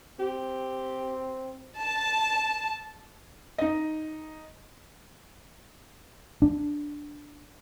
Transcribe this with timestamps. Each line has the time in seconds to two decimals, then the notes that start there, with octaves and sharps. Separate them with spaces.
0.20 C4 G4
1.78 A5
3.58 D#4 D#5
6.42 D4